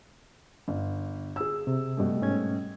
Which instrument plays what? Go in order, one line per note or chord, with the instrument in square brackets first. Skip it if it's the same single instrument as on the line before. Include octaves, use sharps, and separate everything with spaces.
[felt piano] G1
G#4 E6
[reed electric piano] C3
[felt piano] B2 G3 A3
[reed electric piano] G#2 C#4 G#6